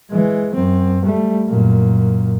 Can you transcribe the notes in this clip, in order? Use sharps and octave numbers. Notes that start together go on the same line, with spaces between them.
E3 G#3
F#2 C4
G3 A3
F#2 A#2